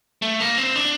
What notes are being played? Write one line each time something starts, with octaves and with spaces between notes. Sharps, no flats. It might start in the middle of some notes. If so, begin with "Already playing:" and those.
A3
A#3
C4
D4